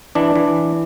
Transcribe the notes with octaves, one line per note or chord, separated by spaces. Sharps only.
E3 D4
E3